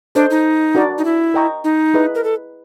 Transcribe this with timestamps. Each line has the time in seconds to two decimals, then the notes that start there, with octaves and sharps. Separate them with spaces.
0.15 D4 A4 C5 D#5
0.30 D#4
0.75 D4 F#4 A#4 D5
0.98 D#4
1.05 E4
1.34 A#4 D#5 G5 A#5 C#6
1.64 D#4
1.94 E4 G#4 B4 D#5
2.15 A#4
2.24 A4